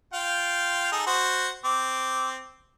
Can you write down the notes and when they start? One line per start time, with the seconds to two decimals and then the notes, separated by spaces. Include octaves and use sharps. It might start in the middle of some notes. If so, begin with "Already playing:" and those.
0.14 F4 F5 G5
0.92 D#4 G#4 A4
1.07 F#4 C5 F#5
1.65 C4 D6